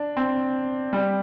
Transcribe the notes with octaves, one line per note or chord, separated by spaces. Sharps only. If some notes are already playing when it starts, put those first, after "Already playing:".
Already playing: D4
C4
G3